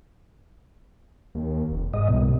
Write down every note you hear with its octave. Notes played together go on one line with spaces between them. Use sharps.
D#2
F1
G#2 D#5
C2 B2